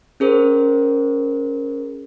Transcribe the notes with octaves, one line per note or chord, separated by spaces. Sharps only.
C#4 G#4 A#4 C5